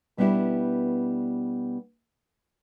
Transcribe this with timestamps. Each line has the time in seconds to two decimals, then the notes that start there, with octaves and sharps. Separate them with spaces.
0.17 B2 G3 B3 D4 E4 G4